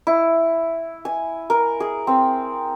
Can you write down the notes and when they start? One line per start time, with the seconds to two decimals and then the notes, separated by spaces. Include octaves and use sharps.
0.07 E4
1.05 G#5
1.50 A#4
1.80 G#4
2.07 C4